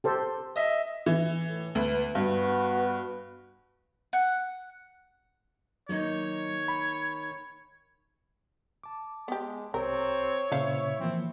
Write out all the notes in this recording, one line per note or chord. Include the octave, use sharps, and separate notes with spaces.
G4 A4 C5
D#5 E5
E3
A2
D2 B4
G2 B3 F#4 B4
F#5
D#3 F#3 A#3 D#4 C#5
B5
A5 D6
G#3 B3 G4
C2 C4 G4 A#4 C#5 A#5
A#2 C#3 E4 B4 C5 F5
E3 F3 A#3 C4